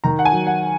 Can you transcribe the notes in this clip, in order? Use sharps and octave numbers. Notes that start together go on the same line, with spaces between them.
D#3 A#5
F#5
G#5
F#3
F#5